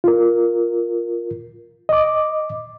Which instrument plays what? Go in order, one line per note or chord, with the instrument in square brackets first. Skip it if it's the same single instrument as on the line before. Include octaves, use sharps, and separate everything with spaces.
[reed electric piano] F4 A#4
D#5 D6